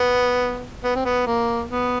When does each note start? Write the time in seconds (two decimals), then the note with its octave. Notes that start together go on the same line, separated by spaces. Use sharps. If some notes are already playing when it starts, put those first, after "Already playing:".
Already playing: B3
0.84 B3
0.95 C4
1.05 B3
1.26 A#3
1.69 B3